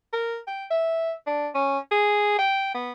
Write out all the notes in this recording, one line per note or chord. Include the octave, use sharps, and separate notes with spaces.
A#4
G5
E5
D4
C#4
G#4
G5
B3